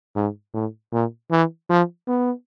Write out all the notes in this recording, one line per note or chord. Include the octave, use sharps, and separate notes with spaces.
G#2
A2
A#2
E3
F3
B3